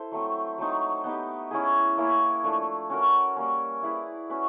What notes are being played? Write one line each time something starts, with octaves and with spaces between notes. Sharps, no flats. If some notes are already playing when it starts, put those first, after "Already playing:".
Already playing: E4 A4 C5
F#3 A3 C4
F#3 A3 C4 D#4
B3 D#4 G4
C#4 E4 G#4
A#3 C#4 E4
F3 A3 D4
C#4 F#4 A#4
G3 A#3 C#4
E4 G#4 B4 D5
C#4 F#4 B4